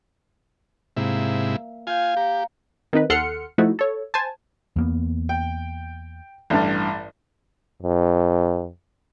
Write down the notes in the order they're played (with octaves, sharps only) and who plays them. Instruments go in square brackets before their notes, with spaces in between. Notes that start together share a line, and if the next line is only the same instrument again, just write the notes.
[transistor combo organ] G#2 C3 E4 [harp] A#3 E5
[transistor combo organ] F4 G#5 [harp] F5 G6
[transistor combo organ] G4 [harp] A#5 C#7
[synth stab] D#3 C4 D#4 B4
D#2 A4 F#5 C6 F6 C#7
F3 A3 D#4 E4 F#4
A4 C#5
C5 G#5 A5
[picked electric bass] E2 A#3 B3
[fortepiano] G5
A1 G2
[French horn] F2